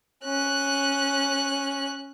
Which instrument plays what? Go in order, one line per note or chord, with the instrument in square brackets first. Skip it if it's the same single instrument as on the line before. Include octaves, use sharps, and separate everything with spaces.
[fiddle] C#4 F#6